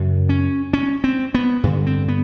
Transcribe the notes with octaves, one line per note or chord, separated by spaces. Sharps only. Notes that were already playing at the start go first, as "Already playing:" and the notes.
Already playing: F#2 C#3
C#4
C#4
C4
B3
G2 D3
C4
B3